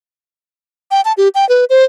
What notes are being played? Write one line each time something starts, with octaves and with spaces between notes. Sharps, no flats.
G5
A5
G4
G5
B4
C5